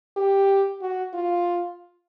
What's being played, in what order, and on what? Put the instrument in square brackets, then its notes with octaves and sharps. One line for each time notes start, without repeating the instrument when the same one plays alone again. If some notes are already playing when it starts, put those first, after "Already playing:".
[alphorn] G4
F#4
F4